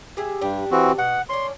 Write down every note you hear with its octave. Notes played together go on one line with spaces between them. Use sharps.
G4 G#4 E5
G2 D4 G4
E3 C4 F#4
B2 F#5
C#4 D4 C6